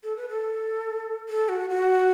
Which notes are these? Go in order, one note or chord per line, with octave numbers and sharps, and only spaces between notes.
A4
B4
A4
A4
F#4
F#4